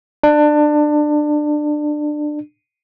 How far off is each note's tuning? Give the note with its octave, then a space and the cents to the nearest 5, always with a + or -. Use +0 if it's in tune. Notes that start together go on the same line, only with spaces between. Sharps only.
D4 +25